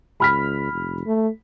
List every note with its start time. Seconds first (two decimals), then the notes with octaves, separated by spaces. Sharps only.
0.20 C#2 B5 F6 B6
0.72 F1
1.06 A3